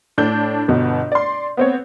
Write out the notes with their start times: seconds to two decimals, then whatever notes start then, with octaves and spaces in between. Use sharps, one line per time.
0.18 A2 D4 G6
0.68 G1 B2
1.12 D5 C6
1.57 B3 C4 C#5